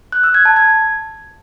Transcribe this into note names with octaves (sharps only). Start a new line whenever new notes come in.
F#6
E6
G#6
A5
G#6